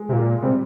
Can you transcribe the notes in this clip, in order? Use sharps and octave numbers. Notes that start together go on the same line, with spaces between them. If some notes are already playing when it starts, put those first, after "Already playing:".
Already playing: G#3
C3
A#2
G#3
C3 G3